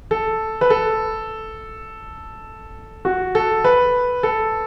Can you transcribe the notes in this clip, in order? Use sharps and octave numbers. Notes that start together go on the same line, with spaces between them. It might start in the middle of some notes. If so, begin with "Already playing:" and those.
A4
B4
A4
F#4
A4
B4
A4